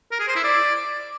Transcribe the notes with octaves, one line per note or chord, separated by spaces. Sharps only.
A#4
G#4
C5
E4
D5